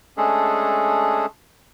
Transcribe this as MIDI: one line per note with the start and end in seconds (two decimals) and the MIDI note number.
0.17 1.26 56
0.17 1.26 57
0.17 1.26 61
0.17 1.26 62
0.17 1.26 68
0.17 1.26 69